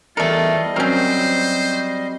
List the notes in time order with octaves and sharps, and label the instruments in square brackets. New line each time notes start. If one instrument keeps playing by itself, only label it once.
[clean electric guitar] E2 A4 [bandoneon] G3 D#5 [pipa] A3 A#4 [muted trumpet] F4
[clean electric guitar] F#3 C4 [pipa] C#4 A#4 [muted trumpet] C5